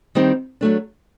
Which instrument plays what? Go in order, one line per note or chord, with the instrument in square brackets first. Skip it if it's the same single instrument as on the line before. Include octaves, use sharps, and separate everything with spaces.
[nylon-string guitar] D#3 G3 C4 D#4
F#3 A3 D4